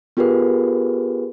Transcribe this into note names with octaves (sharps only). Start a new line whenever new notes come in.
B3 F4 G4 G#4 A#4 B4